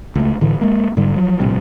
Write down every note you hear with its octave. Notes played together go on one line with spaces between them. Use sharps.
C#2 A3
A2 D3 E3
G#3 A#3
G#2 D3 G3
F3 F#3 G#3
A#1 A2 C3 G3